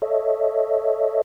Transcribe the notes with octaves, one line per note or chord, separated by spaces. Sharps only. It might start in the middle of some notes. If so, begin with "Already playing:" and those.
A4 C#5 D#5 E5